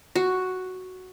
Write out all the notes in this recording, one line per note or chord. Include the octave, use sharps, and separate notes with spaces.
F#4